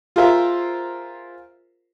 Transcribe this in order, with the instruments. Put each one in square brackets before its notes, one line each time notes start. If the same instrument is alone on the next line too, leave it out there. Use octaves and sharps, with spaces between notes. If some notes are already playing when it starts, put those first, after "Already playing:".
[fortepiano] F4 G#4 A#4 C5 E5 F5